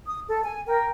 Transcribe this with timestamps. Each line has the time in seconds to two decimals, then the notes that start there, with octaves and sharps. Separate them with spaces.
0.05 D#6
0.28 A4
0.44 G#5
0.67 A#4 G5